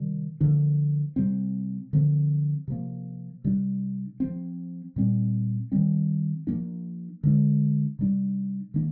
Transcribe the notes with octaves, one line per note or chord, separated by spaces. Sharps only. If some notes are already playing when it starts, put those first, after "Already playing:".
Already playing: C3 D#3 G3
D3 F3 A#3 D4
C3 G3 C4
D3 F3 C4
C3 F3 A#3
C3 G3 D4
F3 C4
A#2 G3 C4
D#3 G3 C4
F3 A#3 D4
D3 G#3 D4
C3 G3 D4
D#3 A#3 D4